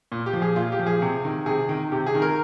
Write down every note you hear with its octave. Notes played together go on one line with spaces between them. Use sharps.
A#2
G4
F3
G#4
A#2 F4
G4
F3
G#4
C3
D#3
C3 G#4
D#3
C3 G4
G#4
D#3
A#4